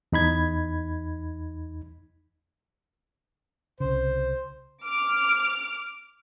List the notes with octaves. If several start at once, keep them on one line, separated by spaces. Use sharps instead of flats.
E2 D#4 B5 G#6
C2 C#3 C5
D6 F6